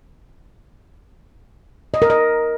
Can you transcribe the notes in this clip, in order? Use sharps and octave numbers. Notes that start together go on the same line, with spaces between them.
D#5
A#4
D#5